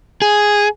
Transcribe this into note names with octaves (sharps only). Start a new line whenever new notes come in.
G#4